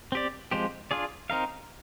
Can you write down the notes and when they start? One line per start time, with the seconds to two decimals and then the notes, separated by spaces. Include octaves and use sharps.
0.12 C4 G4 D5
0.51 F3 G#3 C4 G4 C5
0.91 D4 F4 G#4 D5
1.30 C4 D#4 A#4 F5